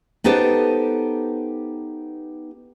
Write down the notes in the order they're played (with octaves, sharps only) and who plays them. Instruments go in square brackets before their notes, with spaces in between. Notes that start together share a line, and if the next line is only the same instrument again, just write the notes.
[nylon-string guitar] B3 D#4 G4 A4 B4 C5